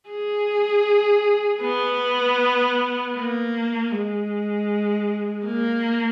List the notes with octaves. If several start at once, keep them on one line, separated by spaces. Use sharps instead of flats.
G#4
B3
A#3
G#3
A#3